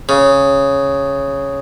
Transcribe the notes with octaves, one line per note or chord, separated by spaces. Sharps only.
C#3